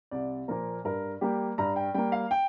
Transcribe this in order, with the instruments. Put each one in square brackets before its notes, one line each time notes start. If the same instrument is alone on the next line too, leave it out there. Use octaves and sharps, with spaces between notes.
[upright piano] C2 D5
A#2 F3 A#3 A#4
G2 A#4
G3 A#3 G4
G2 A#5
G5
G3 A#3 G5
F5
G5